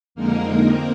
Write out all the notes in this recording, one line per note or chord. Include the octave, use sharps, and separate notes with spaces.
F2 D3 G#3 A#3 D#4 A#4
C4